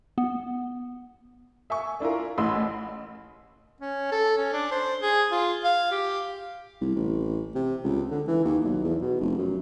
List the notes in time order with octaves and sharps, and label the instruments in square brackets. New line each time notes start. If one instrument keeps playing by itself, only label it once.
[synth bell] B3
[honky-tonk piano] E5 G#5 C#6
D4 E4 F4 A#4
A1 A2 B5 C6 E6
[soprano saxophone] C#4
A4
C#4
D4
C5
G#4
F4
F5
G4
[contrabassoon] C2
A1
C3
C#2
D3
E3
D#2
B1
E2
B2
F1
F#2